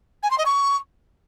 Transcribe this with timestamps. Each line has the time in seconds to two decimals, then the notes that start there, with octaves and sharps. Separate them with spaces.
0.23 G#5
0.31 C6
0.38 D#5
0.46 C#6